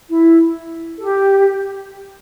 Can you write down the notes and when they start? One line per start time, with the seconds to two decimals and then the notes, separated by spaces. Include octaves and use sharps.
0.09 E4
0.98 A4
1.01 G4